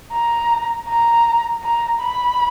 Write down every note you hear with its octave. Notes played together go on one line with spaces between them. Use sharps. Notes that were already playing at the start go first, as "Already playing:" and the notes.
A#5
A#5
A#5
B5